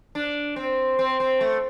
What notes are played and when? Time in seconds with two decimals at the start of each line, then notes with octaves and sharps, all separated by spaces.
0.15 D4
0.56 C4
0.99 C4
1.20 C4
1.41 A3